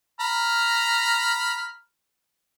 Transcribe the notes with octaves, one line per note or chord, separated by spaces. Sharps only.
A#5 B5 F6